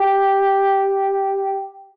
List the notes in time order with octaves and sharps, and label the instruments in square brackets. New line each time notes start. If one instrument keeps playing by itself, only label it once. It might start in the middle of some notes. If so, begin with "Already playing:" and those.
Already playing: [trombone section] G4